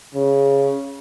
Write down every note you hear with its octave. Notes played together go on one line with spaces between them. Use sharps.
C#3